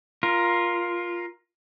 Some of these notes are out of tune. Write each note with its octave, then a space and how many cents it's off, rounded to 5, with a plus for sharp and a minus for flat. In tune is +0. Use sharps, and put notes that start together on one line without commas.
F4 +0 A#4 +15